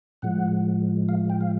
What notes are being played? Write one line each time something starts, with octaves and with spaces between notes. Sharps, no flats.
A2 F3 G#3 F#5
F5
G5
F5